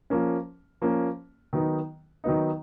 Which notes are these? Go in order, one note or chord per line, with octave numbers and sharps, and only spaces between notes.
F3 A#3 C#4
F3 A#3 C#4
D#3 F#3 B3 D#4
D#3 F#3 B3 D#4